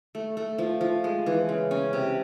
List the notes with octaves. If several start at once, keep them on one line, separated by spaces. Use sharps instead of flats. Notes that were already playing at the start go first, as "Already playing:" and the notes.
A3
A3
F3
F3
G#3
E3
C#3
C#4
C3